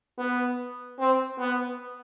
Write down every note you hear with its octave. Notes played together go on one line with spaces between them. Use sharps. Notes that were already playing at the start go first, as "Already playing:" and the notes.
B3
C4
B3